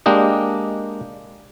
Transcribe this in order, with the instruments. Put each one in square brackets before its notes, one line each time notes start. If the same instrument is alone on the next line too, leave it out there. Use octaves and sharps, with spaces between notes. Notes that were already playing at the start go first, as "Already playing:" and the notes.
[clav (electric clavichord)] G#3 A#3 D4 G4 D#5